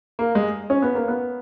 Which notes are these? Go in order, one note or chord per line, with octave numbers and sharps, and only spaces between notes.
A#3
G#3
C#4
B3
A#3
B3